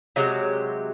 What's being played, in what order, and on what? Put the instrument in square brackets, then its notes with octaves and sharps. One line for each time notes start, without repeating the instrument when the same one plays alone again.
[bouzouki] C3 F#3 G#3 G4